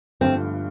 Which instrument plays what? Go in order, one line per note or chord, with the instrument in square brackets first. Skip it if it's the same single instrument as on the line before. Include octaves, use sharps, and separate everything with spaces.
[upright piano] G1 G2 D3 F3 A3 [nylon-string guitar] C4